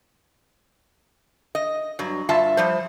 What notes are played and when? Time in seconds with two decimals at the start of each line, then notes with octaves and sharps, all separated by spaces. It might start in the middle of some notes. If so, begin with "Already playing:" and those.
1.55 D#5
1.99 G2 F#3
2.29 G2 F4 E5 A5
2.57 F3 G3 C5